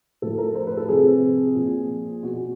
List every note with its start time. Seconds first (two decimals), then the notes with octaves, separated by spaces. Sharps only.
0.22 A2 F3 A4
0.38 A#4
0.55 C5
0.67 B4
0.77 A4
0.88 C3 F3 G#4
1.56 A#2 F3
2.22 B2 F#4